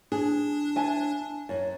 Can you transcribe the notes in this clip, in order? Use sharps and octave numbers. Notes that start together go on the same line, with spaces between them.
D4 G#4
E5 G#5 A5
F#2